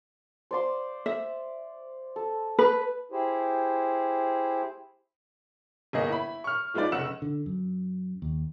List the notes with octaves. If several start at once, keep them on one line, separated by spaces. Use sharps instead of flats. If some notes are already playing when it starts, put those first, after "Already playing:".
C5 D5 C6
E5
A4
B4
E4 G4 G#4 C5
G1 A#3 G#4 D#5
E4 B5
C#6 F6
F3 G#3 B3 D#4 D5
F1 C#3 F#5 E6 E7
D3
F#2
D#2